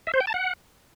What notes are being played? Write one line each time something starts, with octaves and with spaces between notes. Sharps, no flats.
E5
C5
G5
A5
F#5